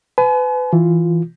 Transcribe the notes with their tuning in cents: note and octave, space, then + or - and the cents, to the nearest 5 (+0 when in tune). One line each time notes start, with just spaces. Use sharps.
B4 +30 G#5 +45
E3 +0 F4 +0